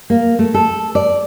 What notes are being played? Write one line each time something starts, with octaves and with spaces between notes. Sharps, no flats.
A#3
A3
A4
D5